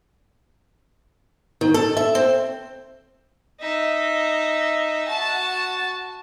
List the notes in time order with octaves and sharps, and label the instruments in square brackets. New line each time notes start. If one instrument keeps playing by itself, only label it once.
[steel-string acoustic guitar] D#3
A4
E5
C4
[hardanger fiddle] D#4 E5
F#4 A5